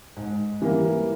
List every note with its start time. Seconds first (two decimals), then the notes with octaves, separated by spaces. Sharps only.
0.17 G#2
0.62 E3 G3 A#3